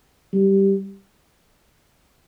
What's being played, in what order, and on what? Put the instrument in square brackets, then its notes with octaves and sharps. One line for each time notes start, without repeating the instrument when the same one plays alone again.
[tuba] G3